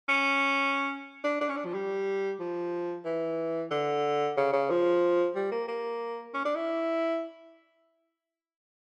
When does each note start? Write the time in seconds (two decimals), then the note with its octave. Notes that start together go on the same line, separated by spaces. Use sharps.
0.09 C#4
1.24 D4
1.41 D4
1.49 C#4
1.57 D4
1.65 F3
1.74 G3
2.40 F3
3.05 E3
3.71 D3
4.37 C#3
4.53 C#3
4.70 F3
5.35 G3
5.52 A#3
5.68 A#3
6.34 C#4
6.45 D4
6.55 E4